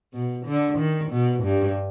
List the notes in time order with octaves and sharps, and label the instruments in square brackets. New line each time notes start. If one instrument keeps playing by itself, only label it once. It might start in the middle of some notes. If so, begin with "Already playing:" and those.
[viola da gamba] B2
D3
D#3
B2
G2